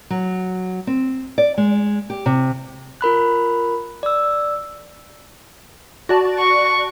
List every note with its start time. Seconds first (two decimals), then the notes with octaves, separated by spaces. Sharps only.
0.10 F#3
0.87 C4
1.38 D5
1.58 G#3
2.10 G4
2.26 C3
3.01 F4 A#4 B5 F#6
4.03 D5 E6
6.09 F#4 D5 A5
6.40 C#6